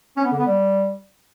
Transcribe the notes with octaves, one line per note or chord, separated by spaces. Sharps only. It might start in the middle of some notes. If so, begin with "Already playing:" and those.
C#4
B3
D3
B3
G3